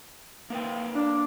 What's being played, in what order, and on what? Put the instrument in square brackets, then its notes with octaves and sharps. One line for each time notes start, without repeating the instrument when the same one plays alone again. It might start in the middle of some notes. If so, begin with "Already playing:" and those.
[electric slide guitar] A#3 B4 G5
[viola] D4